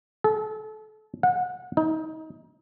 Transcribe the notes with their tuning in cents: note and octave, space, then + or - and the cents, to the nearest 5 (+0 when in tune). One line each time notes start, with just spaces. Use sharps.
A4 -35
F#5 -30
D#4 +25